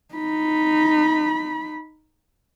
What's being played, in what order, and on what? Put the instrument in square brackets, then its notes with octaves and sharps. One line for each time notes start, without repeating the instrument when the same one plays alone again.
[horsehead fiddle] D#4 B5